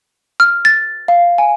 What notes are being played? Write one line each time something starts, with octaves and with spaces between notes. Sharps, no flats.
F6
A6
F5
G#5